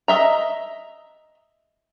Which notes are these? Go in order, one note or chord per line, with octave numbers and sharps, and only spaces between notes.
D#5 E5 A#5